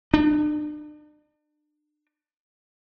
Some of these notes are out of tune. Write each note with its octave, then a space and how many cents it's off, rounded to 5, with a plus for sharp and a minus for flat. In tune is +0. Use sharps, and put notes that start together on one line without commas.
D4 +40